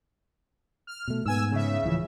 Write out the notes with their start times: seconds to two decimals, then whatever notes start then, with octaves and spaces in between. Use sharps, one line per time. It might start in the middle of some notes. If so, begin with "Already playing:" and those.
0.87 F6
1.08 B2 A3
1.26 G#2 B3 G#5 E6
1.51 C#3 E5
1.83 D1 E3 F3